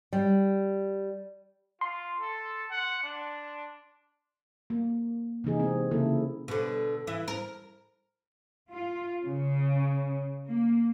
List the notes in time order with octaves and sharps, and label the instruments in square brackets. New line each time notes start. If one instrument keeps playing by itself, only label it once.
[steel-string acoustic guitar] G3
[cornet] F4 [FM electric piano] C6
[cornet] A4
F#5
D4
[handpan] A#3
C3 E3 D#4 G#4
G#3 C4
C#3 A#3 E4 A4
[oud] B2 D3
E3 E4
A#4
[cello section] F4
C#3
A#3